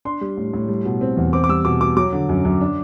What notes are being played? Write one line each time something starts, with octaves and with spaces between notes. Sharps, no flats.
D4 C6
G3
A2
A2
G3
B2
C4
E2
C4 D6
D6
G3 E6
B2 D6
B2 D6
F#3 D6
D3
F#2
F#2
D4